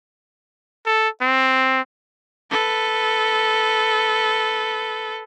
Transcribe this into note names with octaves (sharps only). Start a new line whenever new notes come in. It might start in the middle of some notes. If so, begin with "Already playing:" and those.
A4
C4
A4 B4